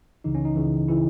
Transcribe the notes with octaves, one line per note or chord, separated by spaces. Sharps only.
C#2 C#3 E3 D#4
C#4
D#4
C#2 C#3 E3
C#3 E3 E4